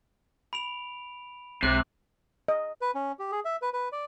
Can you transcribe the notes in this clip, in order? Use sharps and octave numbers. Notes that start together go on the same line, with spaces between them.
B5 D7 F7
B1 C3 G#3 D6 F#6 F#7
D#5
B4
C#4
G4
G#4
E5
B4
B4
D5